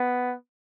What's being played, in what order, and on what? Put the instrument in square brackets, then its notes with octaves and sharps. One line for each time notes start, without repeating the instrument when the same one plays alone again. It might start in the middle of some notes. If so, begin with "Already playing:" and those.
Already playing: [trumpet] B3